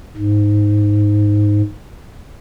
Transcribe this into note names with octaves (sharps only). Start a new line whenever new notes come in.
G#2